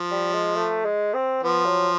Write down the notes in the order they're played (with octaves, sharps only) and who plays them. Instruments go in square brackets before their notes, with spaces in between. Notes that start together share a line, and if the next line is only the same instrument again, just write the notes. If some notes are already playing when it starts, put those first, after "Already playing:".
Already playing: [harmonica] F3
[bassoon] G3
G#3
A3
G#3
C4
[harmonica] F3 [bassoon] B3
[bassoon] F#3